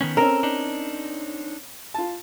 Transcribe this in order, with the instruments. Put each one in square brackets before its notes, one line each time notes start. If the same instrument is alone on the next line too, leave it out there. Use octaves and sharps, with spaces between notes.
[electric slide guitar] D#3 B3 C#4
[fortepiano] C4 C#4 [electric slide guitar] A4 [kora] A#4
[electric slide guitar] D4 D#4
[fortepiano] F4 A5